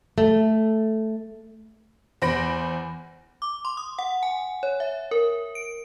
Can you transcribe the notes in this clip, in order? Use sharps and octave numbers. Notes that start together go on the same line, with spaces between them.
A3
E2 C5 B5 A#6 D7
D6
C6
D#6
F#5
G#5
C#5
E5
A#4
D7